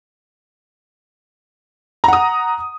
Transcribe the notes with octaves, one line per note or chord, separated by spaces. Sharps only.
F#5 A#5 D#6